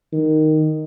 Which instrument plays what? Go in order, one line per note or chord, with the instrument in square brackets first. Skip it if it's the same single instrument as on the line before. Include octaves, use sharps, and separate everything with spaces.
[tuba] D#3